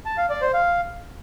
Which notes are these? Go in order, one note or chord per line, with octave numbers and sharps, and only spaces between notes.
A5
F5
D5
C5
F5